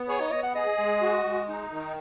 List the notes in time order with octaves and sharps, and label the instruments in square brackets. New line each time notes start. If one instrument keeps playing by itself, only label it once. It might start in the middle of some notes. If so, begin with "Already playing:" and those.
Already playing: [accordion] B3
[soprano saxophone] G#4 [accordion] C#5
[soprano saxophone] D#4
[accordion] B3 [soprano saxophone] D#5
[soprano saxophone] F#5
[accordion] G#4 [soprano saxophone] D#5
[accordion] G#3
F#4
G#3
D#4
D#3